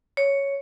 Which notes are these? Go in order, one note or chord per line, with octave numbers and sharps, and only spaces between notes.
C#5